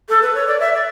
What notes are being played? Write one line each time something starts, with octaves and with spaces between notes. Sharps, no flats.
A4
B4
C#5
D5
E5
D5